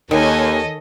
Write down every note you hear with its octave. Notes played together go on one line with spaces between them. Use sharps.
D#2 D#3 A4 C#5 D#5 G#5